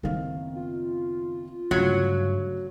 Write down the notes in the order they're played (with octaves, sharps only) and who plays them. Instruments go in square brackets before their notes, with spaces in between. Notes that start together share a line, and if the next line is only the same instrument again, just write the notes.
[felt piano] F#1 D#3 F5 [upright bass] B3 C4
[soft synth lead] F4
[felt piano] D2 C#3 G#6 [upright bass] G2 [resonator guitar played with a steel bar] F#3